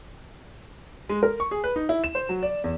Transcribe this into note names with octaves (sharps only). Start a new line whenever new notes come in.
G#3
A#4
C#6
G#4
B4
D#4
E4
E7
C5
F#3
D5
E2